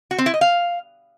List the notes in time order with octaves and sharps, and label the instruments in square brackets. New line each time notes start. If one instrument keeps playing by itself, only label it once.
[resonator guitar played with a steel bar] F#4
C4
E4
D#5
F5